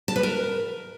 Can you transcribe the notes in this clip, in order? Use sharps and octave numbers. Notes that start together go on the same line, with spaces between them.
A5
B4
A#4